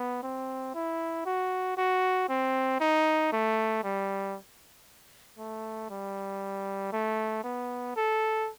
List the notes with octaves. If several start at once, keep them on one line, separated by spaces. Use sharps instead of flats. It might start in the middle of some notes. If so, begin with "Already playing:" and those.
Already playing: B3
C4
E4
F#4
F#4
C4
D#4
A3
G3
A3
G3
A3
B3
A4